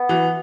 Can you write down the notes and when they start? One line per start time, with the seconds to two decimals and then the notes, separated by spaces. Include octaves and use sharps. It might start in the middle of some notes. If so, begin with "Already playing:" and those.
Already playing: B3
0.09 E3 F#3